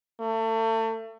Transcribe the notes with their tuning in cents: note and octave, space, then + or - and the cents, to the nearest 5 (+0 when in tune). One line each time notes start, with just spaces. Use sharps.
A3 +30